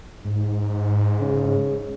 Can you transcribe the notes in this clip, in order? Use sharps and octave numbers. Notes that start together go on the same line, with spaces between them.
G#2
C#3